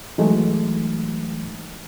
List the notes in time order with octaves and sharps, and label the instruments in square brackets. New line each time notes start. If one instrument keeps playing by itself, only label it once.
[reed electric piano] E3 F#3 G#3 A3 D#4